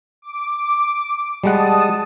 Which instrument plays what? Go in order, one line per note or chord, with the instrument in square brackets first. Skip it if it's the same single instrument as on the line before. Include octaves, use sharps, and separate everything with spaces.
[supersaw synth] D6
[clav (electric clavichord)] G3 G#3 F#5 [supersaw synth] A5 D#6